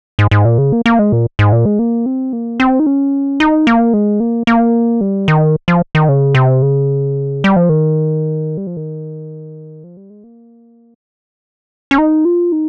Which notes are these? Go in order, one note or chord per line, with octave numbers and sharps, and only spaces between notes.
G#2
G#2
A#2
C#3
A#3
A#3
G#3
A#2
G#2
A#2
G#3
A#3
C4
A#3
C4
D#4
C#4
D#4
A#3
G#3
A#3
A#3
G3
D#3
F3
D#3
C#3
C3
C#3
G3
F3
D#3
G3
F3
D#3
F3
G3
G#3
A#3
C#4
D#4
F4
D#4